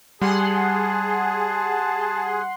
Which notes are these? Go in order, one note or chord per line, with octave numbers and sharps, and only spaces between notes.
G3 G#4 F#5 A5 C6